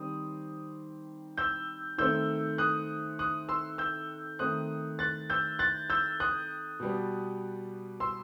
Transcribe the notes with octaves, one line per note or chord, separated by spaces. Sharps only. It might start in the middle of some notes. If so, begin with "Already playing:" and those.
Already playing: D#3 G3 C4 D#6
E6 G6
D#3 A3 C4 E6 G6
D#6 F#6
D#6 F#6
C6 E6
E6 G6
D#3 A3 C4 D#6 F#6
F#6 A6
E6 G6
F#6 A6
E6 G6
D#6 F#6
B2 G3 B3
C6 E6